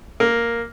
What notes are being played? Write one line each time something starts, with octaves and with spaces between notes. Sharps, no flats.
A#3